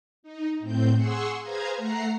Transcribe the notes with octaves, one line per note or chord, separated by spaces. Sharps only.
D#4
A2 C4 G6
G#4 F#5 C6 C#6 E6
G#4 B4 C5 F5 A#5 G#6
A3 F#5 A#5 C7